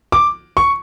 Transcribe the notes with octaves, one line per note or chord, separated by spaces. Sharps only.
D6
C#6